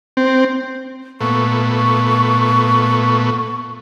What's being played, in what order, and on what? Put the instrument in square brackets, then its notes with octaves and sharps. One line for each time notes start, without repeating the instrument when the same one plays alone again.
[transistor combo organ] C4
[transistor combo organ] A#2 A3 B3 [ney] C#6